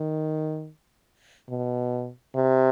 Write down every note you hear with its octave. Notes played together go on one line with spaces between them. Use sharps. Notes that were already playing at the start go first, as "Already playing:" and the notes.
Already playing: D#3
B2
C3